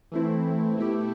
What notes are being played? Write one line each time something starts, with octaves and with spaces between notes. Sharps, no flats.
E3 A3 C4 E4
B2 A3 E4 G4